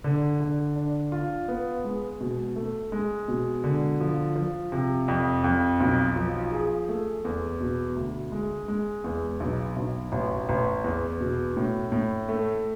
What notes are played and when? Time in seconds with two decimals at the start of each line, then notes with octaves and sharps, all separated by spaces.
0.04 D3
0.40 D3
0.76 D4
1.12 F4
1.48 B3
1.84 G#3
2.20 B2
2.56 A3
2.92 G#3
3.28 B2
3.64 D3
4.01 F3
4.36 F3
4.72 C3
5.08 F2
5.44 F2
5.80 B1
6.16 F3
6.52 G#4
6.89 A3
7.25 E2
7.60 B2
7.96 D2
8.32 G#3
8.68 G#3
9.04 E2
9.40 B1
9.76 B1
10.12 A1
10.49 A1
10.84 E2
11.20 B2
11.57 A2
11.92 A2
12.29 A3